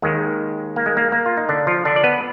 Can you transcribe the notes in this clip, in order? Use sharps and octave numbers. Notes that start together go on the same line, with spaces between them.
D#2 D#3 G#3
A#3
G#3
A#3
A#3
F4
D#4
D3 D4
F3 F4
D3 D4
D5
B3 B4